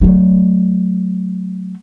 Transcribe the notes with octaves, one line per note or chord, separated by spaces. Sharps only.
F#3 A3